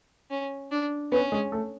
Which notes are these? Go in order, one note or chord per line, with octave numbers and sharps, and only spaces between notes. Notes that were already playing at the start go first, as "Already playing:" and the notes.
C#4
D4
B3 C#4 B4
G#3 G#4
A3 A4